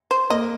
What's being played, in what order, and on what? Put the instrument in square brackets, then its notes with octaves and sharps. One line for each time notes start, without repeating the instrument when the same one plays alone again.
[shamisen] C5
[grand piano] A#3 [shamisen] D#5